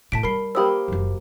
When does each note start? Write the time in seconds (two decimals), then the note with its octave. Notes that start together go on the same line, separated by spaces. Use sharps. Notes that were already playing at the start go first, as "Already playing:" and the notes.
0.12 A2 A5 B6 D7
0.23 G3 A#4 B5 C7
0.55 A#3 G4 C5 B5 D#6 E6
0.88 F#1 F#2